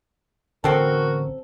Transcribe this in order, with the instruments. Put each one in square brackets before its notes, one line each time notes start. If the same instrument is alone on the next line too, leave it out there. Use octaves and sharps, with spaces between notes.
[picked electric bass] A1 D3 C#4 [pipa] F#3 C4 A4 [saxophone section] F#4 A#4